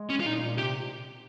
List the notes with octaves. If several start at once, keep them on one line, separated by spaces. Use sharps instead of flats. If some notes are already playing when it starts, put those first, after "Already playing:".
Already playing: G#3
C#4
F4
A#2 D#4
A#2
C3 G4